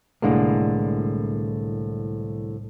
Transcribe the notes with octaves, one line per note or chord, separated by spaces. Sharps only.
C2 A2 D3 G#3 A#3